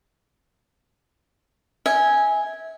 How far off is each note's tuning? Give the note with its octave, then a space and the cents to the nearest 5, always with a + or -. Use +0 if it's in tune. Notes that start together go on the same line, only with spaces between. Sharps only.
E5 -30 G#5 +0